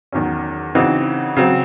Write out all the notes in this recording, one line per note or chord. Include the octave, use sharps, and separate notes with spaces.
E2 D#3 F#3 C#4
C#3 E3 C4 D#4 F#4
C#3 F#3 C4